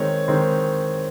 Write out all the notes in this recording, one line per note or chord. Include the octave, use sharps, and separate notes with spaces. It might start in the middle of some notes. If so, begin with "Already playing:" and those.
Already playing: D#3 G#3 C4 C#5
D#3 G#3 C4